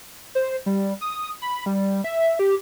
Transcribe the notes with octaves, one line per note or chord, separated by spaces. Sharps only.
C5
G3
D#6
B5
G3
E5
G4